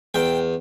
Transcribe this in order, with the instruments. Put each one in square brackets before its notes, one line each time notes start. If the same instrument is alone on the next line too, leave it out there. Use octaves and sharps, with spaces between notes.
[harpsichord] E2 G5